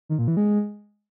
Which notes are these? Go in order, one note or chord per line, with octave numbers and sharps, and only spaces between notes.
D#3
A#2
E3
G#3